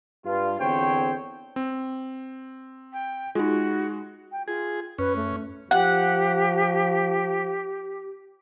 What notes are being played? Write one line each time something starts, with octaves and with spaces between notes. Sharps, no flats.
G2 F4
E2 D3 C4 C5 C#5 G5
C4
G5
G#3 D#4 F4 F#4
G5
F4 G#4
F#2 C#4 B4
A3
F3 G4 F#5